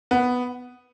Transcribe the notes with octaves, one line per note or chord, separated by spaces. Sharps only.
B3